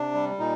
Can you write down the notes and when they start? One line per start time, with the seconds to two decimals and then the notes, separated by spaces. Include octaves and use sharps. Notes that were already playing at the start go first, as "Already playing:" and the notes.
Already playing: C3 D4
0.14 G3
0.39 A#2 D#4